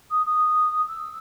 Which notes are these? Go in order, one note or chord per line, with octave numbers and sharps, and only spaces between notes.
D#6
D#6
E6